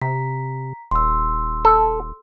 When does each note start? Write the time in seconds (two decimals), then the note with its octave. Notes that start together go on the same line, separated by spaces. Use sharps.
0.02 C3 A#5 B6
0.91 D#1 C6 E6
1.65 A4